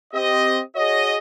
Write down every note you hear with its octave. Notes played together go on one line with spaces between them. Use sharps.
C4 G4 D#5
F#4 G#4 C#5 D#5